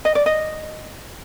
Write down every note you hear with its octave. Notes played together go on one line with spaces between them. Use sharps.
D#5
D5
D#5